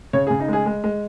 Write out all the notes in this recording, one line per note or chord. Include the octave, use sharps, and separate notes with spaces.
C#3 C#5
C#3 G#4
D#4
G#3 G#4
G#3
G#3